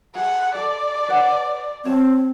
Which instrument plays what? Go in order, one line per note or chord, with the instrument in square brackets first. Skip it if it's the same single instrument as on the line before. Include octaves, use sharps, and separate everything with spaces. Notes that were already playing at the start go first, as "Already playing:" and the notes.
[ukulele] G#4 [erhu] F#5
[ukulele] A4 [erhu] D5
[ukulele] B4 C#5 F#5
[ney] C4 [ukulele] C#5 A5